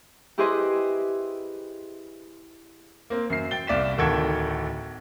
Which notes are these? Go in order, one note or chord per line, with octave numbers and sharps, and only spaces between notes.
E4 G4 G#4 B4 C5 D#5
A#3 C4
F#2 C7
G5 A6 G7
C2 D5 F5 B6 E7
D1 D#3 A4 F#5 G5 G#6